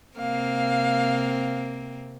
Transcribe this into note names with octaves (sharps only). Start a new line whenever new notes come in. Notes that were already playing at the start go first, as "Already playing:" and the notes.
C3 A#3 C4 F5